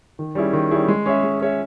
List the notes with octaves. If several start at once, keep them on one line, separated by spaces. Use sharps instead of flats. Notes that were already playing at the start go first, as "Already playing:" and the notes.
D#3
G3 C#4 E4 G#4
D#3
G3 C#4 E4 G#4
G#3
C#4 G#4 C#5 E5
G#3
C#4 G#4 C#5 E5